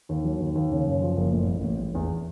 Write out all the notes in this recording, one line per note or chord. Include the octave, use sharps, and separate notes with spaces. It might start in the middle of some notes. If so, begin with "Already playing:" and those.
D#2
F#3
D#2
D#2
C#3
F#2
F3
F#1
A2
A1
A1
A1
E2